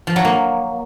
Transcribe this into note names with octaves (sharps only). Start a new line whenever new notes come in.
F3
F#3
A#3